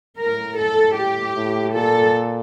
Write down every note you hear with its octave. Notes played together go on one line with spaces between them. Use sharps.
A2 A#4
A4
G4
A2
A#2 A4